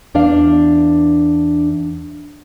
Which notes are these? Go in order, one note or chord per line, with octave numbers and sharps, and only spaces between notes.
E2 D4 D5 F5